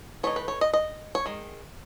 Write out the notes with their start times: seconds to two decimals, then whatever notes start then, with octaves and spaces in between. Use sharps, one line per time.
0.23 E3 A3 D#4 C#5
0.36 B4
0.48 C#5
0.61 D#5
0.73 D#5
1.15 C#5
1.26 D#3 G#3